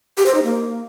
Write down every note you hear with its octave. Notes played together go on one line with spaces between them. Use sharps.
G4
C5
D#4
A#3